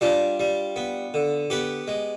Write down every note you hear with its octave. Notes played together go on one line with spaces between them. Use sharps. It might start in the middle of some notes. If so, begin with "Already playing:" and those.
G3 D4 F4
G3
B3
D3
B3 G4 B4
G#3